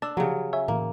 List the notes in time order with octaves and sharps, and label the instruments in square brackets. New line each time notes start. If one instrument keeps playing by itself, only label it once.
[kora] D4 [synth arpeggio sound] A5 E6
[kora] C#3 F#3 [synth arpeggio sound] F3 G4
[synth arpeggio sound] C#5 E5 G#5
[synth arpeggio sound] A2 E3 [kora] A#3